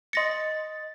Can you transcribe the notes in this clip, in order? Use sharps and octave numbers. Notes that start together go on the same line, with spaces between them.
D#5 C6 A6 A#6 C#7